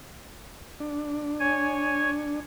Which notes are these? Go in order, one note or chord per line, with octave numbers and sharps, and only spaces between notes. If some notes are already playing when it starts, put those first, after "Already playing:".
D4
C#5 G#5